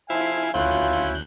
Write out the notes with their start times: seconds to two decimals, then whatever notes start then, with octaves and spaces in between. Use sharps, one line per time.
0.10 F3 E4 E5 F5 G#5
0.54 D2 F#3 C#4 E4 F4 F#6 G6